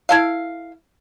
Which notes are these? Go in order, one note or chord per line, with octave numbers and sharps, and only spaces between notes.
E4 A4 F5